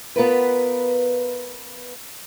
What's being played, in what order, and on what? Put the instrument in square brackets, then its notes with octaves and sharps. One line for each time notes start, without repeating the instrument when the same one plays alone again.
[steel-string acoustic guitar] B3 F4 A#4 B4